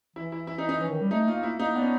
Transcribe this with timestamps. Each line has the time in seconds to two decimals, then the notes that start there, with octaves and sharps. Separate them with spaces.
0.16 E3 E4
0.32 E4
0.47 E4
0.58 D#4
0.69 D#4
0.80 E3 C#4
0.90 D#3
1.01 G3
1.11 A3 D#4
1.27 A#3 F4
1.43 A#3 E4
1.59 A#3 D#4
1.75 B3 D4
1.82 C#4